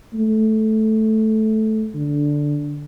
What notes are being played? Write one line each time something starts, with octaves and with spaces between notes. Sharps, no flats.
A3
D3